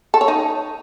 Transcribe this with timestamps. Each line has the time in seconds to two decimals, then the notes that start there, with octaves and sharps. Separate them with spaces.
0.14 A4
0.21 C#5
0.28 D#4